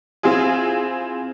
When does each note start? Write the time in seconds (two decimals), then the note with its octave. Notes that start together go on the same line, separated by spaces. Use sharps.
0.23 C4 E4 F4 G#4